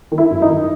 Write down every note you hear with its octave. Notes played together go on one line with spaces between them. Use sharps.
D#3
E4
F#2
D#4
D#3